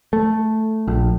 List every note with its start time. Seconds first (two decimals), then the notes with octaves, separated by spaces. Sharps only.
0.13 A3
0.88 A#1